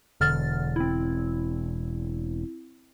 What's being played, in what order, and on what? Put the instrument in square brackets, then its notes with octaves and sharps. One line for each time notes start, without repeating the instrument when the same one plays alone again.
[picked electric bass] E1 [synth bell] D3 F6 A6
[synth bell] C4 E4